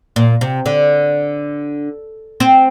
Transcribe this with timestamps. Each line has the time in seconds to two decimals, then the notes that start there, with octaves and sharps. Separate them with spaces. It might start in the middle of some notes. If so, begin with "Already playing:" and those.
0.16 A#2
0.41 C3
0.66 D3
2.40 C4